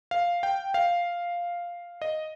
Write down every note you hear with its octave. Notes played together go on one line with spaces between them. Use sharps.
F5
G5
F5
D#5